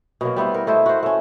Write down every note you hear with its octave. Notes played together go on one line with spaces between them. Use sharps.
B2 F#3 A#3
G3 B3 E4 C5
A#4
A3 E4 C5 D#5
F#4 C5
A3 C#4